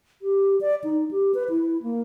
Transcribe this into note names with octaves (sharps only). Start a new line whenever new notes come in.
G4
D5
D#4
G4
B4
E4
A#3